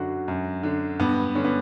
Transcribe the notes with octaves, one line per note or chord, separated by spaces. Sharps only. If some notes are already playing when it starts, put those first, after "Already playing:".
Already playing: F#2 D3 F#4
F#2
D3
G2 B3
D3 C#4
B3